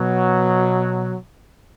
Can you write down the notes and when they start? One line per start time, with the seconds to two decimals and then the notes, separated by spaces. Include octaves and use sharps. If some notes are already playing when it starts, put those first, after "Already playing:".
Already playing: B2 F#3